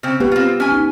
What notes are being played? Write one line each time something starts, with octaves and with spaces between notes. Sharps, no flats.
C#3 C4
B2 B3 G4 B4
C4 F4
C#4 G#5
D#4